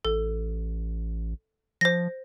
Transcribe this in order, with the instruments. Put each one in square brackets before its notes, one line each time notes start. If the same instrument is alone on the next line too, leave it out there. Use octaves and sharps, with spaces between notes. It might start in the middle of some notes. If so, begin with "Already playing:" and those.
[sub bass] A1 [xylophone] A4
[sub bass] F3 [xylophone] C5 A#6